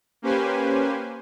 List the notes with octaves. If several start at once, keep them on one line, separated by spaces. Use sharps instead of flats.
A#3 C#4 G4 B4 C5 G#5